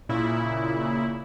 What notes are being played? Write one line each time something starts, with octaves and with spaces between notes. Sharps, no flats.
A#2 C#3 E4